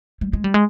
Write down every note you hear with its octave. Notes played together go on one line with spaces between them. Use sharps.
G3
G#3
G3
G#3